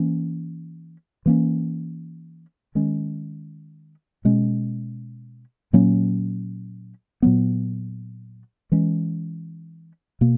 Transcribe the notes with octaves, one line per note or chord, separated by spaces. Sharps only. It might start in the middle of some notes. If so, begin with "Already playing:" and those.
Already playing: E3 A#3 C#4
E3 A#3 C#4
D#3 G#3 C#4
B2 G#3 C#4
A#2 F#3 A#3 C#4
A#2 F#3 B3
E3 G#3 C#4
B2 A#3